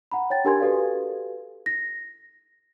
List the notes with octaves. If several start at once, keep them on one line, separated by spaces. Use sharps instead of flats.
F#5 A#5 B5
C#5 G5 A6
D4 G4 A#4 G#5 C6 G#6
F#4 G4 A4 B4 D5 F5
A#6